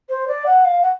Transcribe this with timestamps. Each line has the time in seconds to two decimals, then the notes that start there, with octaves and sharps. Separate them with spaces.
0.09 C5
0.28 D5
0.46 F#5
0.65 F5
0.83 F#5